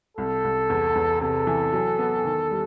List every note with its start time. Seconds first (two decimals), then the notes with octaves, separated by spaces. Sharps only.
0.17 C2 A4
0.44 C2
0.70 E2
0.95 E2
1.21 C3 A4
1.47 E3
1.73 F#3
1.99 B3
2.25 D#3
2.51 G3